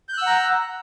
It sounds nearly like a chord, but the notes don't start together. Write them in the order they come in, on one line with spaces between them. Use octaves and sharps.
G6 F#6 E6 F#5 A#5